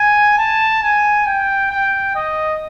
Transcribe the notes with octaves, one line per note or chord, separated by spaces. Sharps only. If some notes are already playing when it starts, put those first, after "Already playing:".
Already playing: G#5
A5
G#5
G5
G5
D#5